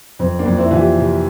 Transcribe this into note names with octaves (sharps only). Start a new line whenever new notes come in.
F2 C4
A#3 D4
F2
C4 E4
E3 F4
E4 G4
C3